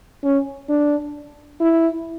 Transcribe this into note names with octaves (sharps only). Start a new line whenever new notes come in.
C#4
D4
E4